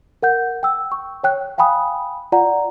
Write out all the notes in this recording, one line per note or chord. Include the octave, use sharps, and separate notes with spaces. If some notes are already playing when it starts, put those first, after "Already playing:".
A#4 F#5 G6
G5 E6
C#6
C#5 G5 F#6
F5 G5 G#5 B5 D#6
F4 D5 F#5 A#5